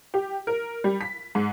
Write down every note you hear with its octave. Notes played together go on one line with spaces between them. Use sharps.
G4
A#4
G3
B6
G#2